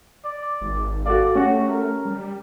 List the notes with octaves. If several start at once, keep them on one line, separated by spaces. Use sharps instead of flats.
D5
G#1
F#4 A4 D5 F5
A3 C#4 F#4 G4
A#4
G3